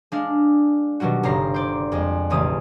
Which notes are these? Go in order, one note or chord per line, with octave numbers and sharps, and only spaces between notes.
G#3 D4 F5
B2 D#3 F#3 G3 F#4
G1 C#3 A#5 C7
C5 D5
F2 G#3
E1 A1 C#3 D#6